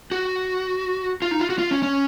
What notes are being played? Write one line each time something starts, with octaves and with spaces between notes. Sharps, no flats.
F#4
F4
D#4
F4
F#4
F4
C#4
C#4